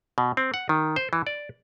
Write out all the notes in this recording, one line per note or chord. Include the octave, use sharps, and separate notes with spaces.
B2
C4
F#5
D#3
C5
E3
D5